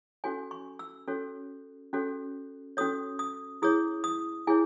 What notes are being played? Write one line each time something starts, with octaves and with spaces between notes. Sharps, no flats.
C#4 F#4 A4 C#5 G#5
C#6
E6
C#4 F#4 A4 C#5
C#4 F#4 A4 C#5
C#4 F#4 A4 C#5 D#6
D#6
E4 G#4 C#5 D#6
D#6
E4 G#4 C#5 G#5